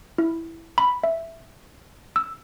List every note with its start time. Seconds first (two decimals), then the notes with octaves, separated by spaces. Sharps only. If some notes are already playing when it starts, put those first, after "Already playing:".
0.18 E4
0.78 B5
1.04 E5
2.16 E6